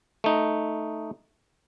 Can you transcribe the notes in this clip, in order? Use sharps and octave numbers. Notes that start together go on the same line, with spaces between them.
A3 D#4